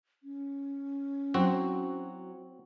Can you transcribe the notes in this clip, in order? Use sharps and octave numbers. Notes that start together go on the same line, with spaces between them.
C#4
F#3 C4 E4 F#4 C5